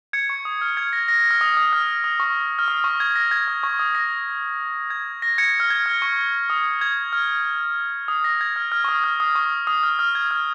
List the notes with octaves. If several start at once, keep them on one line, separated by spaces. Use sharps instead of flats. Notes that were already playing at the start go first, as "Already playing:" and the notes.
G#6 C#7
C#6
D#6
F6
G#6
A#6
A#6
A#6
F6
D#6
D#6
F6
D#6
C#6
F6
D#6
C#6
G#6
A#6
G#6
D#6
C#6
D#6
A#6
G#6
A#6
G#6 C#7
F6
G#6
F6
C#6
D#6
G#6
F6
D#6
A#6
G#6
F6
F6
C#6
D#6
F6
D#6
C#6
D#6
F6
F6
G#6
F6